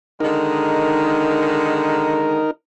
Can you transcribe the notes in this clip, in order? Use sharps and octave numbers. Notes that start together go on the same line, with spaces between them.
D3 D#3 G#3 D#4 A#4